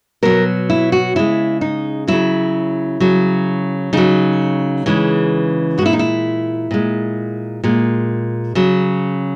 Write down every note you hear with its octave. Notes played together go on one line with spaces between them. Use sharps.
B2 F#3 A#4
E4
F#4
C#3 G#3 E4
D#4
C#3 F#3 E4
C#3 F#3
C#3 F#3 D#4
C#3 E3 G#3
A#2 G#3 E4 F#4
D#4
E4
A#2 G#3
A#2 G#3
C#3 F#3